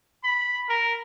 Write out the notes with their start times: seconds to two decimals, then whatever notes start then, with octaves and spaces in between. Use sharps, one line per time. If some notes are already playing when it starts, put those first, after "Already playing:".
0.24 B5
0.69 A#4